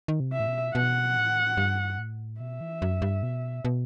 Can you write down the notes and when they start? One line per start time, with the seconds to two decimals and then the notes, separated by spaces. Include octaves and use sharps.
0.08 D#3
0.20 C3
0.33 E5
0.40 A2
0.47 B2
0.75 B2 F#5
1.17 A2
1.57 G2
1.98 A2
2.40 B2 E5
2.61 E3
2.82 F#2
3.02 G2
3.23 B2
3.65 B2